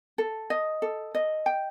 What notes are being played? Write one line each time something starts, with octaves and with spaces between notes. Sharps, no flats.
A4
D#5
A4
D#5
G5